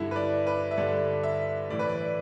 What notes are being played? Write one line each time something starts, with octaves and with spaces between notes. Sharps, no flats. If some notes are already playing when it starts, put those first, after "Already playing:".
Already playing: G2 D3 E4
B4
D5
B4
E5
G2 D3 D5
E5
A2 E3 D5
B4
D5